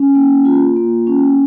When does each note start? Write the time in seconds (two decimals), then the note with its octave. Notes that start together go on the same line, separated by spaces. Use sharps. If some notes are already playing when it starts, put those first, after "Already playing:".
Already playing: C#4
0.15 A#3
0.45 F4
0.76 A#3
1.07 C#4